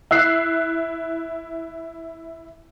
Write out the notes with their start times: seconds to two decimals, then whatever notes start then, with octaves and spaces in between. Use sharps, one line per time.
0.11 E4 E6 F#6 C7